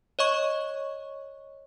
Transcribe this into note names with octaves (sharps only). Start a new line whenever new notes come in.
C#5 D#5 C#6